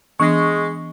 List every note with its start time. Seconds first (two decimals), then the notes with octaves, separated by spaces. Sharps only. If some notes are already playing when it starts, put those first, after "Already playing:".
0.20 E3 G#3 B3 D4 C#6